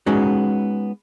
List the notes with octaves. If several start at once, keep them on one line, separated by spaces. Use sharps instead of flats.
G#3 B3 C#4 D#4 F#4